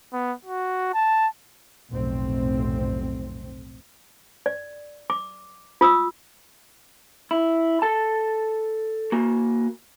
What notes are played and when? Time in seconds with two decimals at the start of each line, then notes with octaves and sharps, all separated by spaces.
0.13 B3
0.45 F#4
0.94 A5
1.90 F1 B1 A2 C4
4.46 D5
5.10 D6
5.81 F4 D#6 E6
7.31 E4
7.82 A4 A5
9.12 A#3 F#4